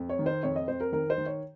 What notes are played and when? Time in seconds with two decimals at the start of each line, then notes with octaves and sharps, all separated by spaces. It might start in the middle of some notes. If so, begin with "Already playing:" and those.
Already playing: F2
0.09 C#5
0.19 D#3
0.26 C5
0.43 F2 C#5
0.56 D#5
0.68 F2 C5
0.81 A#4
0.92 D#3 A#4
1.10 C5
1.18 D#3
1.26 C#5